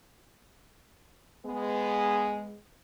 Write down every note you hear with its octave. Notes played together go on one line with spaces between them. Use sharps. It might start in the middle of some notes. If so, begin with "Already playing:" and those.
G#3 B3